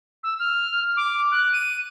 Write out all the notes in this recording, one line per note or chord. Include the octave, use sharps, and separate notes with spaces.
E6
F6
D6
F#6
D#7